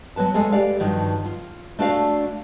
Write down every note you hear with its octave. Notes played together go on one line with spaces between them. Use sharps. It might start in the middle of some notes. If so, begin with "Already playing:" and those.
F#3 B3 B4 A5
G#3 A3 A4 C#5 G#5
G4 B4 D5 F5
G2 D#3 F3 F#3
F4
A3 D4 F#4 D5 F5